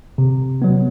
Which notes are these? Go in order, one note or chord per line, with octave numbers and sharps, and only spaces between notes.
C3
F#3 B3